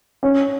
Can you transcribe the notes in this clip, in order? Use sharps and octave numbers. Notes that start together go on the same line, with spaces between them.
C#4